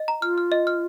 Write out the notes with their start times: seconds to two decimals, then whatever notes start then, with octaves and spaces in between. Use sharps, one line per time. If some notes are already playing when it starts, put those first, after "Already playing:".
Already playing: D#5
0.08 A#5
0.22 F4 F6
0.38 F6
0.52 D#5
0.67 F6